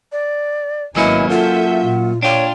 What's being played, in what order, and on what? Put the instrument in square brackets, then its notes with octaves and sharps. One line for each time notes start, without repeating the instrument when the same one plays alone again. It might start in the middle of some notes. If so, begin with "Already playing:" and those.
[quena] D5
[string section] G#1 B3 G#5 [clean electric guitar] F#3 A#3 C#4 [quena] E4 [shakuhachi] D#5
[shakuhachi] F4 [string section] A4 E5 G6 [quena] F#5
[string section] A#2
[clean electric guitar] D4 F4 [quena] C#5 [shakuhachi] G5